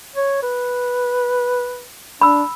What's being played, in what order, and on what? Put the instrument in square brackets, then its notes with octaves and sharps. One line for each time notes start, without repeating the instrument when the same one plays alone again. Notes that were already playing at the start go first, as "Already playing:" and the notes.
[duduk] C#5
B4
[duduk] D4 [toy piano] B5 E6